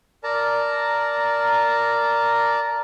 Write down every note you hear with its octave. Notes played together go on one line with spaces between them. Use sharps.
A#4 D5 A5 A#5